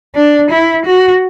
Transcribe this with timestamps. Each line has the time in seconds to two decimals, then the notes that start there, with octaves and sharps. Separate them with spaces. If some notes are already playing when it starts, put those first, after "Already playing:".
0.15 D4
0.50 E4
0.85 F#4